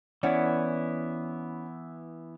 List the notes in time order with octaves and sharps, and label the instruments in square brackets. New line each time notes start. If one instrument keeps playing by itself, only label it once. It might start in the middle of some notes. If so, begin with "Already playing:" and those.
[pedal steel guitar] E3 B3 E4 [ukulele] C#4 D5 F#5